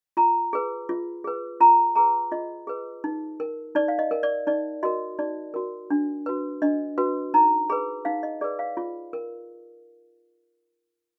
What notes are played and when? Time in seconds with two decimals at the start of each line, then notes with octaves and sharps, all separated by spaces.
0.17 F4 A#5
0.53 G#4 B4
0.89 F4
1.24 G#4 B4
1.61 F4 A#5
1.96 G#4 B4 A#5
2.32 F4 D#5
2.67 G#4 B4
3.04 D#4
3.40 A#4
3.75 D#4 D5
3.88 F5
3.99 D#5
4.11 A#4
4.23 D5
4.47 D#4 D5
4.83 F#4 A#4 D#5
5.19 D#4 D5
5.54 F#4 A#4
5.90 D4
6.26 F#4 B4
6.62 D4 D#5
6.98 F#4 B4
7.34 D#4 A#5
7.69 G#4 B4 B5
8.05 D#4 F5
8.23 D#5
8.41 G#4 B4 D5
8.59 F5
8.77 F4
9.13 A#4